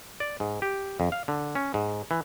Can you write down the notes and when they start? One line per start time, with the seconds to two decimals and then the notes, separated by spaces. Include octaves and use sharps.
0.20 D5
0.40 G#2
0.62 G4
1.00 F2
1.12 F5
1.28 D3
1.55 C#4
1.74 G#2
2.11 E3